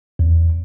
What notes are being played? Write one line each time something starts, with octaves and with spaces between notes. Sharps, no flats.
E2